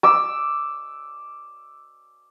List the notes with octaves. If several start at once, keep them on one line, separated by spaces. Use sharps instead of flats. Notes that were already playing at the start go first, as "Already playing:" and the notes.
D6 E6